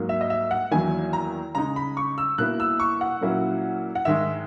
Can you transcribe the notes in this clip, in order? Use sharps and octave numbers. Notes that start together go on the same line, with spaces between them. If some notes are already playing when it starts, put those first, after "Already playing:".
Already playing: G#2 F#3 A#3
E5
D#5
E5
F#5
E2 D#3 F#3 A#3 E4 G#5
A#5
C#3 G#3 D#4 A#5
B5
C#6
E6
B2 A#3 E4 F#6
E6
C#6
F#5
A#2 F#3 A#3 C#4 E4
F#5
G#2 D#3 G#3 E5